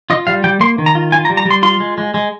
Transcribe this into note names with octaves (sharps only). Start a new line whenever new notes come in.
F4 D#5
G3 F5
G3 G5
A#3 C6
D#3
A#5
F4
F4 G#5
A#5
G3
A#5
G3
C6
F4 C6
G#3
G#3
G#3